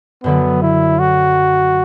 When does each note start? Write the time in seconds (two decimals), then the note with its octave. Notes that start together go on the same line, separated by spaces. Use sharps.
0.24 F#2 D3 F#3 B3
0.62 E4
0.99 F#4